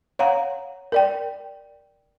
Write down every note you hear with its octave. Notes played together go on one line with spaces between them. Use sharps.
C#5 F5 F#5 A#5
A#4 D5 G5